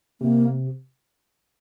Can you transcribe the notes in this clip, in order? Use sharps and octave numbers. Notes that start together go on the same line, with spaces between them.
C3 A#3